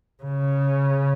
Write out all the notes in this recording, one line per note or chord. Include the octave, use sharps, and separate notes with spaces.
C#3